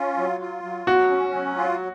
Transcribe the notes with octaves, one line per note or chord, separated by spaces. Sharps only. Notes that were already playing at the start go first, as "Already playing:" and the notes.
Already playing: C#4 F4
F#3
F4
F#3
F#3 F#4
C#4
F#3
F4